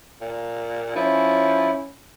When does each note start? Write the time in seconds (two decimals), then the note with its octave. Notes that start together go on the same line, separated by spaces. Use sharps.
0.21 A#2
0.96 F3 C#4 E4